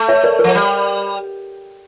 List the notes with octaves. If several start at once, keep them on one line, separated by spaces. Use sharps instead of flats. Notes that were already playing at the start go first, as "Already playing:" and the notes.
Already playing: A3
C#5 E5
A#4 D5
F3 A#4
G3